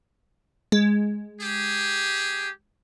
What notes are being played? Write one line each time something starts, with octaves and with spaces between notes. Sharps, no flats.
G#3
G4 G#4